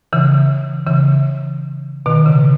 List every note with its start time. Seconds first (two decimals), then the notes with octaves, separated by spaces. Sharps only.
0.13 C#3 E3
0.87 C#3 E3
2.06 B2 D#3
2.26 C#3